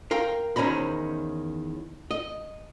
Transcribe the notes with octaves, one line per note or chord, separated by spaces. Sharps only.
A#4 F5 G5 C6
E2 D#3 C#4 C5 A#5 B5
D#5